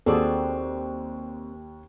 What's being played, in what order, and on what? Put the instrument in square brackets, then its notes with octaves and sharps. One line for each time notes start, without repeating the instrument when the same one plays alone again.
[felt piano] D#2 [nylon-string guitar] C4 D5 [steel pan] F#4 G#4 A4